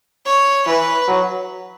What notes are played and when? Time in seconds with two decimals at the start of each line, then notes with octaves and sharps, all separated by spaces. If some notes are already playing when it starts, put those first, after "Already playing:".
0.25 C#5
0.66 E3 B4
1.08 F#3